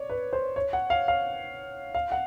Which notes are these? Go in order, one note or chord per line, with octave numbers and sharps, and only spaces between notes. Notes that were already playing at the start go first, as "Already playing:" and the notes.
Already playing: C#5 D5
B4
C5
C#5
F#5
F5
F5
F5
F#5